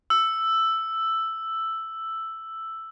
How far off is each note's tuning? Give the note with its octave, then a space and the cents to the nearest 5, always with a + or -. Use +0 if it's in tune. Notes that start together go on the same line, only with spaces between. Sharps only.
E6 +5